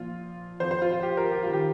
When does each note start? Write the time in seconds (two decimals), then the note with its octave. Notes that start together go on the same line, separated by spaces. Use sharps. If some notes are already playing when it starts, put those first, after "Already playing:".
Already playing: A#2 F3 F4
0.60 F2 F3 C5
0.71 C5
0.82 F4
0.92 F4
1.03 G4
1.17 A#4
1.32 G4
1.43 D#3 G3 F4
1.53 G4